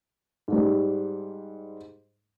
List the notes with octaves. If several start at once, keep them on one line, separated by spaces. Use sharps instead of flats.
G#2 G3